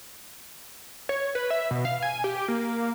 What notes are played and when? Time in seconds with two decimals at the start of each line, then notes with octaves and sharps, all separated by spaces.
1.09 C#5
1.35 B4
1.50 E5
1.71 B2
1.85 F5
2.02 G#5
2.24 G4
2.48 A#3